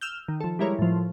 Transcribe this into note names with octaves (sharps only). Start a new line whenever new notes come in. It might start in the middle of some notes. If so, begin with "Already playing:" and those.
E6 F6 G6
D#3
F3 A4
G3 G#3 E4 A#4 C#5
A2 F3